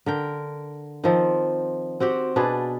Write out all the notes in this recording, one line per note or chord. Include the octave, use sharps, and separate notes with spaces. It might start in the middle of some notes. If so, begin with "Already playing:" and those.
D3 A#4 G5
D#3 F3 C4
C4 F#4 G4 F#5
B2 D4 G#4 B4